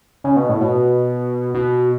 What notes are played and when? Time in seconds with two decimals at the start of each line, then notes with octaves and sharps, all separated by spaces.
0.24 C#3
0.36 B2
0.49 A2
0.61 B2
1.54 B2